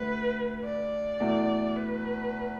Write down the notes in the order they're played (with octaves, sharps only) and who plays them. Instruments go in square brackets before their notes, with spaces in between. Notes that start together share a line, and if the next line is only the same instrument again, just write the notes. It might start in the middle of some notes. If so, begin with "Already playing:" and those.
Already playing: [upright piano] D2 A3 [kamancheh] B4
[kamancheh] D5
[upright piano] E2 B2 A3 E4
[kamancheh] B4